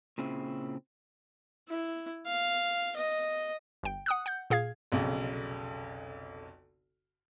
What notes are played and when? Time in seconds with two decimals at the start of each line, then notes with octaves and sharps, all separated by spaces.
0.18 A#2 C#3 C4 E4
1.69 E4
2.27 F5
2.96 D#5
3.83 G1 G5
4.06 F#5 D#6 F#6
4.26 F#5 G6
4.50 A#2 G#4 F5 G#6
4.92 F1 B1 F2 C#3